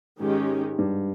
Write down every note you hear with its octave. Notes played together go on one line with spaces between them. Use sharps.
G#2 D#3 G#3 C#4 G4
G2